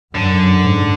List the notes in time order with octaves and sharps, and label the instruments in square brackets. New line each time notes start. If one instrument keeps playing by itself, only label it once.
[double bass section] F#2 [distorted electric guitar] D3
[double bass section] G#2